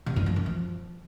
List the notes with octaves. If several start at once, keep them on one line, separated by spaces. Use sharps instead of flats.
C3
G2
F3
F#2
F3